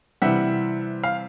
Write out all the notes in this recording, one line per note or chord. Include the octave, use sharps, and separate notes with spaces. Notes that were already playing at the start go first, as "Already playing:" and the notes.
C3 E3 G3 E5 F#5
F5